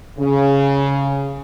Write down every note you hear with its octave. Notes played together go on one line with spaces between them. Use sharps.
C#3